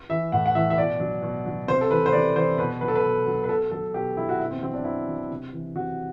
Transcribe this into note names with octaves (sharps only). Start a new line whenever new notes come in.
E3 E5
A2 F#5
F#5
E3 E5
E5
B2 D5
F#3
B2
F#3
C3 C5
A4
E3 B4
C5
C3 D5
E3 C5
B2 B4
F#3 B4
A4
B4
B2
F#3
B4
B2 A4
F#3 A4
B2 G4
F#3 E4
F#4
B2 E4
C4
F#3 C4
D4
B2 E4
F#3
C3
E3
C3 F#4